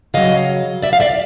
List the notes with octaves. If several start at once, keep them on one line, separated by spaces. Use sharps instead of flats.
C#3 F#3 D#5 F5
D5 E5
F5
D5 E5